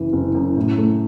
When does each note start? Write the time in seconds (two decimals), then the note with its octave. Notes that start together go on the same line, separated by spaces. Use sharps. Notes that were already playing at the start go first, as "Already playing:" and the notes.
Already playing: F#1 E3
0.13 F#1
0.34 F#2
0.57 A2
0.78 A3